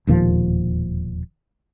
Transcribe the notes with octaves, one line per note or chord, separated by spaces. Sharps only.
E1 D#2 A#2 F3